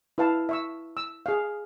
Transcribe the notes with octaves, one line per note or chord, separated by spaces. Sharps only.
E4 B4 F5 A5
E5 C#6 E6
E6
G#4 F5